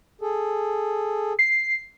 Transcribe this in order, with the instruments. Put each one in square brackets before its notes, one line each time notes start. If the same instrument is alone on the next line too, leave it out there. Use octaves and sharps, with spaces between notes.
[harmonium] G#4 A4
[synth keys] C7